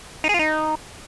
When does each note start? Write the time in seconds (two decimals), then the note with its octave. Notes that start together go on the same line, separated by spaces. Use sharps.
0.24 D#4
0.29 G#4
0.34 F4
0.39 D#4